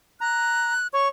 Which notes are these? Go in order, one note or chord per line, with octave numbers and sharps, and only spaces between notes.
A#5 F#6
C#5 C#6